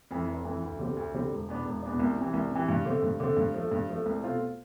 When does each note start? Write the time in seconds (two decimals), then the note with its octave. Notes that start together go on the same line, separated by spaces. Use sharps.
0.11 F2 E3
0.28 F1
0.45 F2 E3
0.62 D2
0.79 D3 G3 C4
0.97 D2
1.14 D3 G3 C4
1.31 E1
1.48 E2 B2 B3 D4
1.65 E1
1.83 E2 B2 B3 D4
2.00 C2
2.17 C3 E3
2.33 C2
2.51 C3 E3
2.69 G2
2.85 D3 A3 C4
3.03 G2
3.20 D3 A3 C4
3.37 G2
3.54 F3 A3
3.71 G2
3.88 F3 A3
4.06 C2
4.23 B2 A3 C4 F4